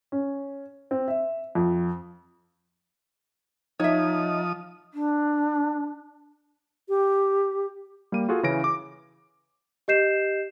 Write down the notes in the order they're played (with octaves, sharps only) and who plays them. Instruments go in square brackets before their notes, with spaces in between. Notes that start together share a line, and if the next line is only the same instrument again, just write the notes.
[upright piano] C#4
C4
E5
F2
[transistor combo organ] F3 D#6 [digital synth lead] D#4 [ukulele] C#5 E5
[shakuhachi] D4
[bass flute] G4
[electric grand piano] G3 A#3 D#7
F4 F#4 G#4 A4
C#3 E3 C#4 A#6 D7
D6
[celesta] G4 D#5 G6 C7 E7